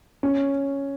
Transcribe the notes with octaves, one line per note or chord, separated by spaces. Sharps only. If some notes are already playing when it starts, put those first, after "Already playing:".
C#4